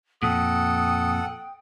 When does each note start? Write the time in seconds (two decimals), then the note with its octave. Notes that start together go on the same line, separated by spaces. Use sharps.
0.23 F2 A#2 A4 F#5 G5 D#6